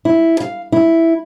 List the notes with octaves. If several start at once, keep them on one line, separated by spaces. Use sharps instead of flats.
E4
F5
E4